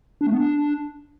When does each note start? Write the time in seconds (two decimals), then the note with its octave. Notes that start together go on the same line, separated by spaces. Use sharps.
0.21 D4
0.27 A3
0.32 B3
0.38 D4